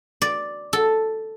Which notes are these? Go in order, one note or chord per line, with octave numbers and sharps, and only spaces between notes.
D5
A4